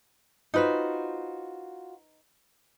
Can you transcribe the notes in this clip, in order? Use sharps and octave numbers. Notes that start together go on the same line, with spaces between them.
D#4 F4 F#4 B4 C5